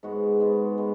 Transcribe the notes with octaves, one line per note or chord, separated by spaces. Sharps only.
G#2 G#3 B3 F#4
G#2 G#3 B3
G#3 B3 G#4